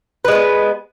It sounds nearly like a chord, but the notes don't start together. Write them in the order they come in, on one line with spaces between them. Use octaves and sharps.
B4 G#3 C4 B3